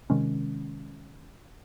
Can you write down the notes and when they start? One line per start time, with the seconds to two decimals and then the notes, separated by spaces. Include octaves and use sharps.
0.10 C3 D#3 G#3 C#4